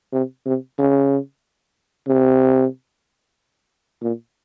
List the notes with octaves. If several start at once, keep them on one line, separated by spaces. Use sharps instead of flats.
C3
C3
C#3
C3
A#2